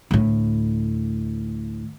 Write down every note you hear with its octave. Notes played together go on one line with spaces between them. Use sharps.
D2 A2